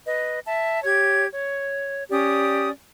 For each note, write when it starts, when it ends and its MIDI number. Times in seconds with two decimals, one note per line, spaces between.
0.06 0.39 71
0.06 0.39 75
0.46 0.83 76
0.46 0.83 81
0.83 1.26 67
0.83 1.26 73
0.83 1.26 92
1.32 2.05 73
2.10 2.70 61
2.10 2.70 67
2.10 2.70 74
2.10 2.70 87